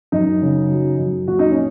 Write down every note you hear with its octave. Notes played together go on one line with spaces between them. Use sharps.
F#2 D#4
C#3
F#3
F#2
A#2 F#4
D#4
C#4